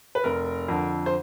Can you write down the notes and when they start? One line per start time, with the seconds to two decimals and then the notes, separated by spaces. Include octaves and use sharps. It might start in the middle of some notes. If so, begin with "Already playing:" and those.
0.15 B4
0.24 F1 A#4
0.68 F2 D3
1.06 C5